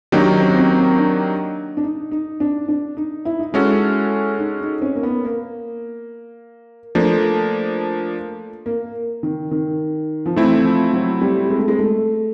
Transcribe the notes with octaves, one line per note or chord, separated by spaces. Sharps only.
D#3 F#3 A#3 D4 D#4 G4
C#4
C4
C#4
C4
D4
D4
D#4
D#4
D4
D4
D#4
E4
D#4
G#3 C#4 E4 F#4 A4
D#4
D#4
C#4
A#3
B3
A#3
F3 A3 A#3 D4
A#3
D#3
D#3
F3
E3 A3 C4 E4
F3
F#3
G3
G#3
A3
G#3
A3